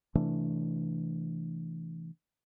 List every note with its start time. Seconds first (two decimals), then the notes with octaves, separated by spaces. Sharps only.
0.15 C3 E3 A3 D4